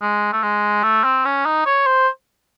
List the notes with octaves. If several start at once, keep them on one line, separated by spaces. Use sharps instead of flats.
G#3
A3
G#3
A3
C4
C#4
D#4
C#5
C5